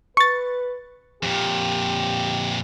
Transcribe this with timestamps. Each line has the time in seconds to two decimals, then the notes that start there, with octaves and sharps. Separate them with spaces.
0.17 B4 C#6 A6
1.23 F2 A#2 G4